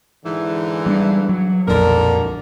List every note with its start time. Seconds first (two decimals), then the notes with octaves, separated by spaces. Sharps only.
0.25 G#2 D3 E3
0.86 G3 A#3 D4
1.29 F#3
1.68 B1 F2 A#2 D3 A#4